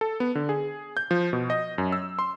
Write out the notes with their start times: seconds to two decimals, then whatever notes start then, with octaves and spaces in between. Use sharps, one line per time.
0.01 A4
0.20 B3
0.35 D3
0.49 G#4
0.97 G6
1.11 F3
1.33 B2
1.50 D#5
1.78 F#2
1.92 E6
2.19 C6